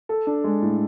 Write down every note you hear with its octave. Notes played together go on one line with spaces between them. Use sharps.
A4
D4
G#3
A2